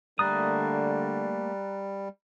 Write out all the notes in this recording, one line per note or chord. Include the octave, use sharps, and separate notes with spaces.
D3 G3 A3 A#3 A#5 D#6 F#6 A6